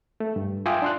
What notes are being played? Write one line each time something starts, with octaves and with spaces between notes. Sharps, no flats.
A3
G2
F4 E5 G5 G#5 D6 D#6
D4 C6 F#6